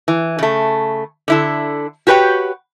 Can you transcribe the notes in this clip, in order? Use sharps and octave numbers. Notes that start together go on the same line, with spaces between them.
E3
C#3 A3
D3 E4 A4
F#4 G4 B4 C#5 G5